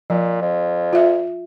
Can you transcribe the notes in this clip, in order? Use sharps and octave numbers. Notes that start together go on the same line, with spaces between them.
A#2 F3
F2
F4 E5